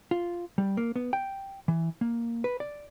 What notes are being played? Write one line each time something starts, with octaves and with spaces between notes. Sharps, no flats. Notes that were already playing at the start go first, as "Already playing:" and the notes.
F4
G3
A#3
B3
G5
E3
A#3
B4
D5